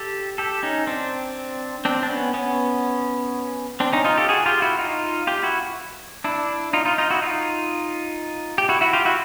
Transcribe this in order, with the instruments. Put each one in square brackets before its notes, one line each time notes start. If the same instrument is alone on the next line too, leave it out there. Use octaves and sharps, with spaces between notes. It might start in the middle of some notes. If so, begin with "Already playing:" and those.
Already playing: [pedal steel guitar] G4 A4
G4 A4
C#4 D#4
C4 D4
C4 D4
D4
B3 C#4
B3 C#4
C4 D4
C#4 D#4
D#4 F4
G4 A4
F#4 G#4
F4 G4
E4 F#4
D#4 F4
F4 G4
E4 F#4
D4 E4
D#4 F4
D#4 F4
D#4 F4
E4 F#4
D#4 F4
G4
E4 F#4
E4 F#4
F4 G4
E4 F#4